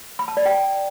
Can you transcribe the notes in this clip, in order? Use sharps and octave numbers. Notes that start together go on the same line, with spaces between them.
B5
A5
D5
G5